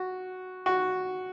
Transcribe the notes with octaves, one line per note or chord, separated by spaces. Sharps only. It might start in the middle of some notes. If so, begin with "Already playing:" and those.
Already playing: F#4
F#4